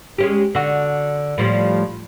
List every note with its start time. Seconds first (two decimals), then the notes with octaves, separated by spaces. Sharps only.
0.18 G#3 C#4 G4
0.55 D3 F#4
1.38 A2 F3 G3